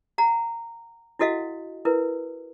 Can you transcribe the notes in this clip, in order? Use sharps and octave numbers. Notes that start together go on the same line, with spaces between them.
F#5 A#5
E4 F#4 A4 D#5 F5 F#5
E4 A#4 B4